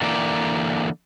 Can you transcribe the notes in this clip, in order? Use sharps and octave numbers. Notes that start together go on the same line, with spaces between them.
D3 E3 A#3 D5